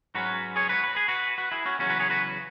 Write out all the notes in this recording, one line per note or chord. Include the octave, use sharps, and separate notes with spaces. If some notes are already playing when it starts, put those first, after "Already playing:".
G#2 F#3 C#4 F#4 B4
G#4 C#5
F#4 B4
B4
G#4
F#4 B4
F#4 B4
E4 G#4
C#4 F#4
E2 C#3 F#3 C#4 F#4
F#4 B4
G#4 C#5
F#4 B4